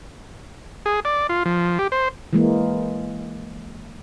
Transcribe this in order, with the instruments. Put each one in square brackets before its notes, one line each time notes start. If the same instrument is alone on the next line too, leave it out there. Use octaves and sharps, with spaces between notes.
[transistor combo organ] G#4
D5
F4
F3
G4
C5
[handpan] E3 G#3 A#3